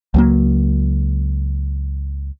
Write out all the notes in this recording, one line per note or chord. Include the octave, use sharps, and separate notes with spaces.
C#2 F#3 A#3